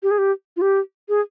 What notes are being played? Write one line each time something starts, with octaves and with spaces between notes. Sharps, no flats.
G4
G#4
G4
F4
G4
G#4